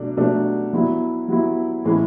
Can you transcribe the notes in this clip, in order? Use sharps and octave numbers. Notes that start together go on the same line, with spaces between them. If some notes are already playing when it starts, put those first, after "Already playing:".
Already playing: B2 F#3 A3 D4
B2 F#3 A3 D4
F#3 B3 E4
F#3 B3 E4
A2 E3 G#3 C#4 E4